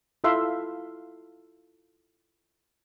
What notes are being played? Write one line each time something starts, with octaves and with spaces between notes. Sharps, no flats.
E4 F4 A4 E5 F5 C6